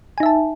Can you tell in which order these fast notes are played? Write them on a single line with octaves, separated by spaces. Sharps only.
G#5 D#4 E5 A5